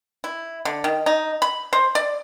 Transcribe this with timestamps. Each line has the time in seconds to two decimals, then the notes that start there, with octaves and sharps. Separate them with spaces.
0.24 E4
0.65 D3
0.84 D#3
1.06 D#4
1.42 B5
1.73 C5
1.95 D5